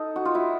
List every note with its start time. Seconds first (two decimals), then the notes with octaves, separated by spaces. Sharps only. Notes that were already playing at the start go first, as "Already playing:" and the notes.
Already playing: D#4 A4
0.16 F#4
0.25 F4
0.35 E4 F#4